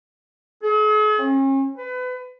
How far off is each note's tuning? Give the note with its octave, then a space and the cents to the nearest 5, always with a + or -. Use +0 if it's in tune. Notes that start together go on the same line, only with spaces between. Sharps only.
G#4 +45
C#4 -40
B4 +30